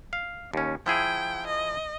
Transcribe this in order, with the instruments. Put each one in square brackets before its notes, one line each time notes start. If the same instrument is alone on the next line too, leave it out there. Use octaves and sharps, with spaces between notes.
[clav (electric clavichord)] F5
D#2 C#4
[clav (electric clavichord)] F3 E4 G#4 [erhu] G5
[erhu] D#5